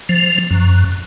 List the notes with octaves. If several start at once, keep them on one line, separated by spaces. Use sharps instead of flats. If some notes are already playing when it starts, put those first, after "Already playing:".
F3
F#2